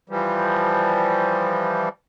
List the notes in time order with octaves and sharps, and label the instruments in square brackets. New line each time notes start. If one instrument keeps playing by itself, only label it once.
[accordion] E3 F3 G3